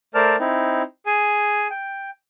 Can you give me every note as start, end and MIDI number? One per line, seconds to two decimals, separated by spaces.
0.15 0.36 57
0.15 0.36 70
0.15 0.36 72
0.15 0.36 74
0.15 0.36 81
0.15 0.36 89
0.40 0.82 60
0.40 0.82 63
0.40 0.82 64
1.06 1.67 68
1.06 1.67 80
1.70 2.10 79